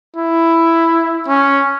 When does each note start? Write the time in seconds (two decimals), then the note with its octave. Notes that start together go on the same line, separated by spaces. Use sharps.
0.16 E4
1.28 C#4